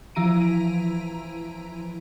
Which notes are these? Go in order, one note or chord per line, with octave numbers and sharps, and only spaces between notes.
E3 F3 E4 A#5 D7 D#7